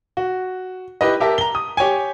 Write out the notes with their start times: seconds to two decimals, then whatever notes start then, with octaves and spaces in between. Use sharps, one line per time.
0.17 F#4
1.01 E4 G4 B4 D#5
1.20 G4 A#4 E5 A5
1.38 A#5 G7
1.55 D#6
1.77 G4 C#5 G5 G#5